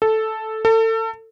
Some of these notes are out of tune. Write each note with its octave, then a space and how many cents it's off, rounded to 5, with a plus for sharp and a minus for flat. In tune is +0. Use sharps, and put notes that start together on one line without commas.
A4 -5
A4 +30